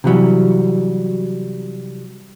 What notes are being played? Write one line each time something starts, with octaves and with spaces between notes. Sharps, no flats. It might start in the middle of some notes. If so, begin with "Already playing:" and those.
C3 E3 F#3 G3